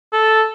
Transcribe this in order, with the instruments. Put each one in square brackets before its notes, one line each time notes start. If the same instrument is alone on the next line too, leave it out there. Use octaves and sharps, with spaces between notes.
[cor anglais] A4